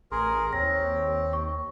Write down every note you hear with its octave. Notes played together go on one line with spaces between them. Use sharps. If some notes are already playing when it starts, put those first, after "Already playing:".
A1 G#4 A#4 C6
D#2 C4 C#5 A#6
C#6